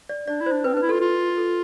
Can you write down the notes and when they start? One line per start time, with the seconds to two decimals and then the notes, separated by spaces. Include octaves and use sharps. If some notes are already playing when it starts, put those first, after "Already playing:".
0.09 D5
0.28 D4 D5
0.41 E4
0.46 C5
0.52 D4
0.64 C4 B4
0.73 D4
0.77 B4
0.82 E4
0.89 F4 A4
1.01 F4
1.37 A4